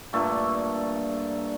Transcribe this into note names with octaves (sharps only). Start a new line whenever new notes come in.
G2 A#2 A3 A4